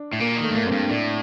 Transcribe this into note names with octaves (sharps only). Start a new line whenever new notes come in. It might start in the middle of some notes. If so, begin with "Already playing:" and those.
Already playing: D4
A2
A#2 A#3
D#3
A3
G2
A2 A#3
F#2
C4
G2
A2 D4